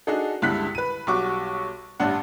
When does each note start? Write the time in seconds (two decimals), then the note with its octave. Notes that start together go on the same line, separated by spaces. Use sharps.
0.07 D4 D#4 F#4 G#4 A4
0.42 C#2 G2 D3 E4 F#6 B6
0.75 B4 D#7
1.07 B1 G3 F#4 C#6 D6
2.00 A1 G2 D4 F#5